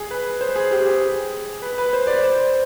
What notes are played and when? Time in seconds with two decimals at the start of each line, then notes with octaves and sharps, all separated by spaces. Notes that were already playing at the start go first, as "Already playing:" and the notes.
Already playing: G#4
0.11 B4
0.41 C5
0.56 G#4
0.71 G4
0.86 G#4
1.62 B4
1.78 B4
1.93 C5
2.07 D5
2.23 C5